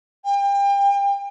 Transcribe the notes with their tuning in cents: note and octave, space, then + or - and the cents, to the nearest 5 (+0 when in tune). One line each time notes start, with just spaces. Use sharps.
G5 +35